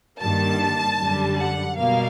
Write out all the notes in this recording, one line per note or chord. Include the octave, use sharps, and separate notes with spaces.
G2 D#3 G3 A#3 A5
F#2 D3 G3
F#5
B2 G3 A#3 F5